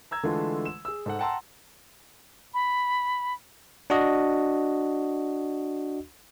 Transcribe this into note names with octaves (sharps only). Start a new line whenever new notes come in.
A#5 E6 G#6
D3 E3 G#3 A3 F4
E7
G#4 E6
G#2 A4 F#5
F#5 G5 A5 A#5 C6 E6
B5
D4 F#4 D#5